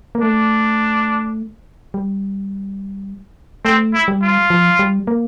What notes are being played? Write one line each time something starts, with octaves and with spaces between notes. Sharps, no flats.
A#3
A3 D4
G3
A3 C4
E4
G3
F4
F3
G3
A#3